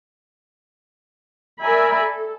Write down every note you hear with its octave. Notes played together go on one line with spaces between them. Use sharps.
A#4 D5 E5 G#5 A#5 B5
A4